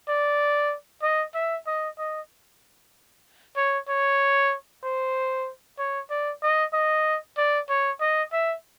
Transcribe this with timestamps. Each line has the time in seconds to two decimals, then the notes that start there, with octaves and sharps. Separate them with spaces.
0.08 D5
1.03 D#5
1.35 E5
1.67 D#5
1.99 D#5
3.57 C#5
3.89 C#5
4.84 C5
5.79 C#5
6.10 D5
6.43 D#5
6.73 D#5
7.38 D5
7.70 C#5
8.01 D#5
8.33 E5